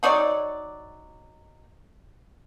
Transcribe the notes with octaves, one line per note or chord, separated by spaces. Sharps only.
F#3 D#4 C#5 D5